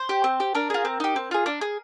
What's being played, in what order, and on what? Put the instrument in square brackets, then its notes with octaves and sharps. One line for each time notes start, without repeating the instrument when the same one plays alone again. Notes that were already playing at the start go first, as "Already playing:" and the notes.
Already playing: [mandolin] C5
G4
C4
G4
D4 A#4
F4 G#4
C4
D#4 G4
C4
F4 G#4
D4
G#4